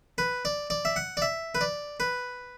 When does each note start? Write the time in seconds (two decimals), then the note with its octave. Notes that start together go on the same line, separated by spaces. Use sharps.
0.18 B4
0.45 D5
0.70 D5
0.85 E5
0.96 F#5
1.17 D5
1.22 E5
1.55 B4
1.61 D5
2.00 B4